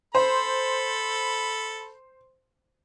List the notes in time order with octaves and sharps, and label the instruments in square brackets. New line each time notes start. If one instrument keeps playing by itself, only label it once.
[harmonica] A4 B5 [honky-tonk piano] C5